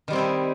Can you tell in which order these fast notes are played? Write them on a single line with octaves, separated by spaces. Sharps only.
D#3 G3 C4 E4 D#4